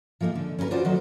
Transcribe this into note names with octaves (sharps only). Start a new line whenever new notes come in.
F3 G#3 A#3 C4 D#4
D3
C#4 E4 G4 A#4 B4
F4 F#4 G#4 C5 D5
D#3 F#3 A3 C5